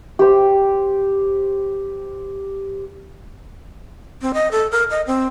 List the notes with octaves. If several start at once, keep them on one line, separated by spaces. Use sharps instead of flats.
G4 C5
C4
D#5
A4
A#4
D#5
C4